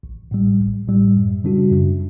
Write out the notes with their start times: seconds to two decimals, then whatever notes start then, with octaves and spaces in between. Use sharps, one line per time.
0.03 A1
0.31 A2 G3
0.60 A1
0.88 A2 G3
1.16 F#2
1.44 C#3 G3 D4 F#4
1.71 F#2